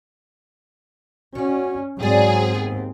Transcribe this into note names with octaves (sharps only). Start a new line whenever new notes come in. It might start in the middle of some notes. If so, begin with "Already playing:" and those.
C#4 F#4 C#5 D5
G#2 F#3 C4 G#4 D5 A5
D#2 B3